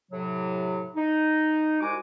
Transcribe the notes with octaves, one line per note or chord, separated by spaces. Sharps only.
A2 C3 F#3
D#4
C2 G#3 F#4 G#5 D6